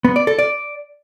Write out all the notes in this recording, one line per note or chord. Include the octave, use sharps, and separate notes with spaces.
B3
D5
A4
D5